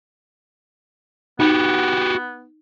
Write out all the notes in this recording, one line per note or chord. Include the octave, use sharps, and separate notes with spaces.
B3 D#4 F#4 G4